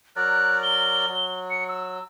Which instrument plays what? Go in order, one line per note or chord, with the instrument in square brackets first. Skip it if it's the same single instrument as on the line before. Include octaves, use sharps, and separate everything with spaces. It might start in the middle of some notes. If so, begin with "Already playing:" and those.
[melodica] F#3 A#4 D5 [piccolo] F#6
[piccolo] G7
[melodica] F#3
[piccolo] C#7
E6